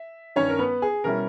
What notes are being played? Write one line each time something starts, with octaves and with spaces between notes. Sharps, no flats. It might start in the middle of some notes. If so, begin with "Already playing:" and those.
Already playing: E5
G2 D#3 G3 C#4 C#5
A#4
B3 B4
G#4
B2 G3 C#4 E4 A#4